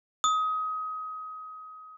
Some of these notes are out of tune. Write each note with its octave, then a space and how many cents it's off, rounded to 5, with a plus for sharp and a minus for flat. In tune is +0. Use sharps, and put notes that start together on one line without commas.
D#6 +25